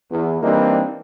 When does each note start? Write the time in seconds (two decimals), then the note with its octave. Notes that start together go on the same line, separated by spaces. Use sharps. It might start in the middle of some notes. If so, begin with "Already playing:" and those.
0.11 E2
0.42 E3 G3 A#3 C4 D4 D#4